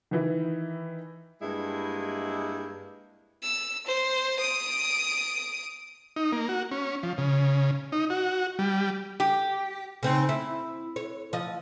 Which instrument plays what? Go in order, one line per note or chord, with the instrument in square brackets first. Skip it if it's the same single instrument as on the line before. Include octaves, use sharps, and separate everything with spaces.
[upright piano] D#3 E3 E4
[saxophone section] G2 G#3 A#3 E4
[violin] E6
C5
D#6 D7
[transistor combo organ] D#4
A#3
F#4
C#4
F3
C#3
D#4
F#4
G3
[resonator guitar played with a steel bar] G4
[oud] C#3 C4 D#4
E4
C#5
F3 D#5